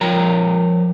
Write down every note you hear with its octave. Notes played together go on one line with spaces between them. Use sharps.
F3 A#4 C#5 G5 A#5